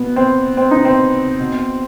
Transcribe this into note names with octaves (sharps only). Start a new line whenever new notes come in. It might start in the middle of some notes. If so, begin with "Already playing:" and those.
Already playing: B2 B3
C4
C4
D#4
C4
B2